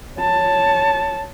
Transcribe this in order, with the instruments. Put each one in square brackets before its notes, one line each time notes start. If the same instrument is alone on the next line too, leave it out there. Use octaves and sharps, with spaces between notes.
[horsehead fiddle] C#5 A5